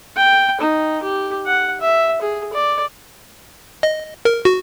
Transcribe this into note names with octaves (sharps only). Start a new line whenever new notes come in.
G5
D#4
G4
F#5
E5
G#4
D5
D#5
A#4
F#4